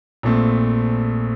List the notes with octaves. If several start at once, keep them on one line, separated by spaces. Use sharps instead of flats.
A#1 A#2 A3 C4